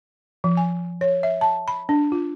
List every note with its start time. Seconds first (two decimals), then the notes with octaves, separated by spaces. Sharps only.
0.44 F3
0.57 G#5
1.01 C#5
1.23 E5
1.41 A5
1.68 B5
1.89 D4
2.12 F4